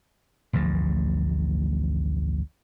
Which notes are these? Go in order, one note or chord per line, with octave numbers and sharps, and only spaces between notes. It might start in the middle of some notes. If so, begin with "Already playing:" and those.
A1 D2 G2 F3